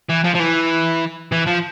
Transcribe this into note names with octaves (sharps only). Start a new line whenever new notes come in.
E3
F3
F3
E3
E3
F3